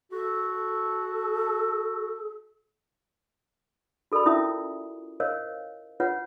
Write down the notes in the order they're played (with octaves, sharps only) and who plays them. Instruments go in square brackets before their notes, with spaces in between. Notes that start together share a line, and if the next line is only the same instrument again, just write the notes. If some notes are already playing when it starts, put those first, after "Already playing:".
[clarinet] F#4 [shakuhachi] A4
[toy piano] F#4 A4 A#4 D5 B5
C#4 E4 F4 A#4 E5 D#6
A#4 C5 C#5 D#5 F5
F4 B4 C#5 F#5